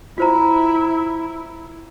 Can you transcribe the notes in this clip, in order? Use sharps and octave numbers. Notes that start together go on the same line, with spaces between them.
E4 F4 C5 A#5